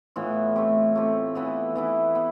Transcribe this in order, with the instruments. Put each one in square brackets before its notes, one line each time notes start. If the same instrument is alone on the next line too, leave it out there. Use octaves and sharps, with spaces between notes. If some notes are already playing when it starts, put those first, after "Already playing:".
[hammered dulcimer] A2 E3 B3 F4
A3 C4 G4
A3 C4 G4
E3 B3 E4
E3 B3 E4
B3